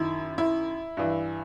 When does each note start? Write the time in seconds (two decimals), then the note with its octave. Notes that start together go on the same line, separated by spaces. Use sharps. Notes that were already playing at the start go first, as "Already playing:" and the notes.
Already playing: F#2 D#3 E4
0.38 E4
0.97 G2 E3